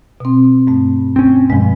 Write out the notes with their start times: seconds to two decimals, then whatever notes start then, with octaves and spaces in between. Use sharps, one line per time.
0.20 B2 C4
0.67 G2 A3
1.16 C4 C#4
1.50 G2 B2 F3 G#3